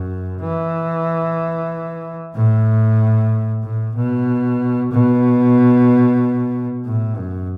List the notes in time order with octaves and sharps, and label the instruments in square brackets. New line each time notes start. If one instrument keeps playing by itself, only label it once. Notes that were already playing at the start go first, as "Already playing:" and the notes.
Already playing: [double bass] F#2
E3
A2
A2
B2
B2
A2
F#2